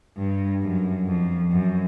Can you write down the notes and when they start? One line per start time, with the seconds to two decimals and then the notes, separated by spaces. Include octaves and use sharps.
0.18 G2
0.62 F#2
1.07 F2
1.51 F#2